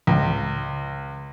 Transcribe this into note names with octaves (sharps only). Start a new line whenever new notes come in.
C#2